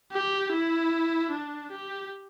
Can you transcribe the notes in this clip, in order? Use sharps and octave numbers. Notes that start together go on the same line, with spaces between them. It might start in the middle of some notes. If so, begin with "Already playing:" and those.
G4
E4
D4
G4